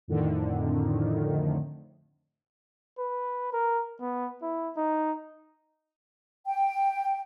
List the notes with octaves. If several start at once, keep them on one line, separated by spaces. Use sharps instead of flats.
F2 A2 D3 D#3
B4
A#4
B3
E4
D#4
G5